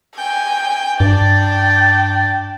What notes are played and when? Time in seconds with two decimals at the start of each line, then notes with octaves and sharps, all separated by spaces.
0.18 G5 G#5
1.00 G2 D4 D5 G5